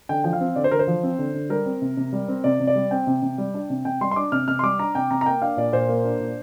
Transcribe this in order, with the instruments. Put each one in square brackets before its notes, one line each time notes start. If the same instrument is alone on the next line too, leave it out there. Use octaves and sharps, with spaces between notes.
[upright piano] D3 G5
F3 G5
F5
C4
D3 D5
C5
D3 A#4
C5
F3
C4
D3
D3
G3 A#4
C4
C3
C3
G3
C4
C3 D5
C3
D5
G3
C4 G5
C3
C3
G3
D4
C3
C3 G5
G3 C6
C6
D4 D6
C3 F6
C3 F6
C6
G3 D6
D4 A#5
C3 G5
C3 A#5
A#5
A#3 G5
D4 F5
A#2 D5
A#2 C5
A#3
D4
A#2